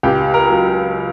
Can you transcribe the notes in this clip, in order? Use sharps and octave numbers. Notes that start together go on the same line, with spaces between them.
C#2 G4
A#4
F#3